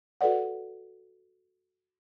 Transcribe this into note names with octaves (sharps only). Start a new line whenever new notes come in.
F#4 A4 B4 D5 F#5